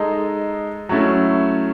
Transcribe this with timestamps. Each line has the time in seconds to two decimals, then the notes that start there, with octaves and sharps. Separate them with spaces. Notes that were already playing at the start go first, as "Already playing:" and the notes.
Already playing: G#3 D#4 A4
0.89 F#3 A3 C#4 E4